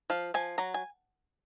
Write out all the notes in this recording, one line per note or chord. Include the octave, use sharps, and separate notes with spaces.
F3 F5
F3 G#5
F#3 A#5
G#5